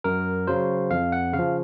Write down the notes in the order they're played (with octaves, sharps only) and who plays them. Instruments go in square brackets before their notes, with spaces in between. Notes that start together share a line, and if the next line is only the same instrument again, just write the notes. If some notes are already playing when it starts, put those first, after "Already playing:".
[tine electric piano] F#2 A#4
C#3 F#3 C5
F2 F5
F#5
C#3 F5
F3